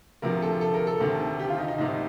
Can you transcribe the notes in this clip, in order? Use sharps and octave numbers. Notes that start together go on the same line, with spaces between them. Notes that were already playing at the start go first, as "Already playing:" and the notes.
D2 C3 F3 A#4
A4
A4
A#4
A4
D2 C3 D#3
G4
F4
D#4
D#4
C2 C3 D#3 D#4